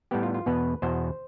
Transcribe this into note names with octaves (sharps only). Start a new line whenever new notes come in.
A2 G3 B3 G4
F4
F4
E2 B2 B3 B4
E2 B2 B3 C5